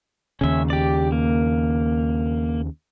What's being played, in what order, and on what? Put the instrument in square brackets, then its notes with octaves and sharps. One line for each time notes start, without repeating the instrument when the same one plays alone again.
[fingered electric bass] D#2 C#3 [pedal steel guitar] C#4 E5
[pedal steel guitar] G4 D5
A#3